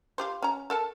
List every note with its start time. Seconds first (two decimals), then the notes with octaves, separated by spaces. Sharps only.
0.18 F4 G4 C5
0.42 C#4 A#5
0.70 A4 A#4 A5